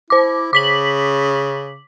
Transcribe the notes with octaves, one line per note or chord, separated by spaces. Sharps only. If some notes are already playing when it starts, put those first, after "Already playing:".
E4 C5 D6
C#3 D6 B6 F#7